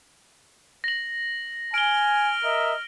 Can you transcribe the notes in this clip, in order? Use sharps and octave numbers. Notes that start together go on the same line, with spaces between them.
A#6 F#7
G#5 F6 D7 G7
A#4 D#5 E5